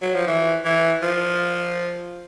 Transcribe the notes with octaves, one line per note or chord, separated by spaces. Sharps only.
F#3
F3
E3
E3
F3